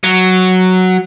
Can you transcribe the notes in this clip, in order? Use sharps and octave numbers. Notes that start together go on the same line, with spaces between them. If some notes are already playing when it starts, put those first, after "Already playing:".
F#3